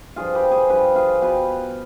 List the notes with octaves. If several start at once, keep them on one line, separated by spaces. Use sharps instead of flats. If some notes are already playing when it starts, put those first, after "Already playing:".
G2 F3 F4 G#4
G4 B4
G#4 C5
G2 F3 G4 B4
F4 G#4
B2 G4 B4